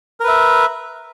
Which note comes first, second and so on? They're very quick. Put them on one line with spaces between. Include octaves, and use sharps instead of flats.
A#4 B4 E5